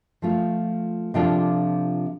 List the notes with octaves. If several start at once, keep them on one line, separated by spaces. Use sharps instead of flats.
F3 A3 F4
C3 F3 D4 F4 A4